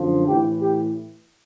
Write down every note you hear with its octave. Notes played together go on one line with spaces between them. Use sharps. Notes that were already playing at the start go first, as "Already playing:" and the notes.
Already playing: F#2 D3 F3
A2 E3 G4
G4